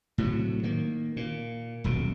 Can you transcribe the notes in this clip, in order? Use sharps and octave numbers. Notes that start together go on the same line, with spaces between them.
A2 C3 D#3 F#3
D#3 A#3
A#2
D#1 B1 B2